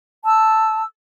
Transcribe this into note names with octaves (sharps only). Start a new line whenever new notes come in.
A5 E6